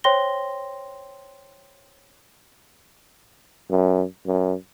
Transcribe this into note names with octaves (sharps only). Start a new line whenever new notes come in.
C5 C#5 G5 C6 A#6 G7
F#2
F#2